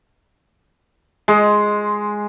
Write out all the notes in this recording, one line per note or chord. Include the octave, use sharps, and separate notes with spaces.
G#3